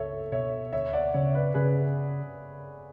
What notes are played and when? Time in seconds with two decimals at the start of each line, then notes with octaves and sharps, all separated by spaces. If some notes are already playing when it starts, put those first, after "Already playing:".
Already playing: C#2 A4 C#5 E5
0.32 B2 C#5 E5
0.73 D2 C#5 E5
0.93 D5 F#5
1.14 C#3 C#5 E5
1.35 B4 D5
1.54 C#3 G#4 B4